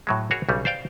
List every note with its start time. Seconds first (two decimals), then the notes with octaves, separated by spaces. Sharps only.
0.07 A2 F#3 G#3
0.31 F#4 G#4 A#4 C#5
0.49 B1 C#3 G3
0.65 C5 D5 F5 G5